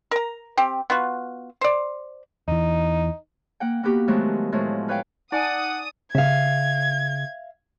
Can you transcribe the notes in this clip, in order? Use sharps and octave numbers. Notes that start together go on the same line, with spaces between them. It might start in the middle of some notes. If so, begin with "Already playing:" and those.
A#4 A#5
C4 G4
B3 F4 F#4
C5 D5
E2 E3 D#4
A#3 F#5 G5
A#3 B3 F#4 G4
D#3 F3 F#3 G#3 A3 B3
A2 F3 F#3 G#3
F4 B4 C#5 F5 G5
D#4 D5 F#5 G#5 A5 D#6
C#3 E5 F5 G#6